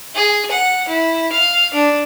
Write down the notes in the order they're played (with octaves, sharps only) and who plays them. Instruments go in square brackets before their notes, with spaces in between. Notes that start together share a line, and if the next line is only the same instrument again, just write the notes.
[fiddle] G#4
F#5
E4
F5
D4